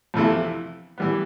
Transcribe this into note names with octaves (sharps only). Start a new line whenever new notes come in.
F2 C3 E3 A3 E4
E3 G3 B3